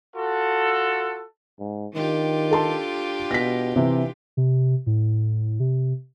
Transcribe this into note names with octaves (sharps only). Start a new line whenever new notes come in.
F4 F#4 A4
G#2
D#3 D4 F4 G4
A4 A5 C6
B2 A#6 B6
C3 E3
C3
A2
C3